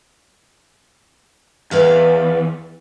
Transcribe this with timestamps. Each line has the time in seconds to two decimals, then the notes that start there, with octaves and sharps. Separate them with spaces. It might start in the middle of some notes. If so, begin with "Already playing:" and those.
1.71 E2 B4 D5 F5